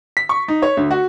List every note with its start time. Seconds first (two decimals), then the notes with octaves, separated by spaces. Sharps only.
0.17 B6
0.29 C#6
0.48 D#4
0.62 C#5
0.77 D2
0.91 F#4